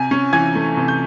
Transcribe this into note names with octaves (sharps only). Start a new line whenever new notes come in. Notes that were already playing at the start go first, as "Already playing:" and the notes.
Already playing: C3 G#5
C#4
E3 G#5 G#6
A3
C3
G6